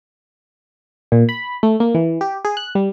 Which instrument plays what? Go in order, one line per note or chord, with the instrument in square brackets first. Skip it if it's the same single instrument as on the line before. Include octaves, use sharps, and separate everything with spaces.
[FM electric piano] A#2
B5
A3
A#3
E3
G4
G#4
F#6
G3